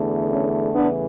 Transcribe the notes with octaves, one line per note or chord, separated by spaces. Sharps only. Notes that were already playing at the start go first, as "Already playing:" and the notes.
Already playing: E2 D3 A3
C#4
E2 C#3 E3 A3 B3 D4